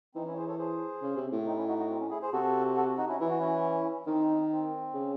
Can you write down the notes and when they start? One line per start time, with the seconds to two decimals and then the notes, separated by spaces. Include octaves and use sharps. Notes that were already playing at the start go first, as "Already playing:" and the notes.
0.15 E3 C4 D#4
0.26 C#4 E4
0.33 C#5
0.37 G#4 C5
0.48 A4 C#5
0.59 G#4 C5
1.02 C#3
1.17 C3
1.32 A2
1.46 C4 D#4
1.57 C#4 E4
1.67 D#4 F#4
1.78 D#4 F#4
1.90 C4
2.00 C#4
2.11 E4 G#4
2.22 G#4 C5
2.33 C3 F#4 A4
2.77 F#4 A4
2.98 D#4 F#4
3.09 C#4 E4
3.20 E3 E4
3.30 F#4
3.39 C#4 E4
4.06 D#3 C4 D#4
4.51 C4
4.94 C#3